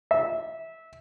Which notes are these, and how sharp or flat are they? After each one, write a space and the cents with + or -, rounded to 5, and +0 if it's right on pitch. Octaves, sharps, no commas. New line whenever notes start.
E5 -20